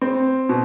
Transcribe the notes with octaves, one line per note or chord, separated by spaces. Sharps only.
C4
B2